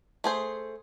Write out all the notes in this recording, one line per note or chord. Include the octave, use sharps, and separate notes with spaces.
A3 G#4 C5